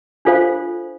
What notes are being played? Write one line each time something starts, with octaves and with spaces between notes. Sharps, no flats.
D4 F4 A4 C5 F5